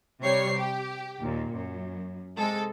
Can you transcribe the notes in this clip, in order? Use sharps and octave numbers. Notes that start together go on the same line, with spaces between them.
C3 G3 C#5 C#6 C7
G4
D#2 A#2
F#2
C3 G#3 A4